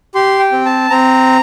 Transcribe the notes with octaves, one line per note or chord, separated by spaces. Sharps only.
G4 C6
G5
C4
A5
C4 A#5